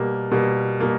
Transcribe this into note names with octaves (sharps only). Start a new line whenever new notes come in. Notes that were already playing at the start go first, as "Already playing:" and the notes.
Already playing: B2 G3 A#3
B2 G3 A#3
B2 G3 A#3